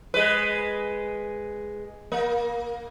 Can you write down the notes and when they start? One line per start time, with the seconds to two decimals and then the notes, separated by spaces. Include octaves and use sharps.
0.14 G#3 B4
2.12 A#3